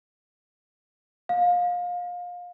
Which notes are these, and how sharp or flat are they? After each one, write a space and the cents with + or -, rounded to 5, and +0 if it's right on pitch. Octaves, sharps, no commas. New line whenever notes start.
F5 +25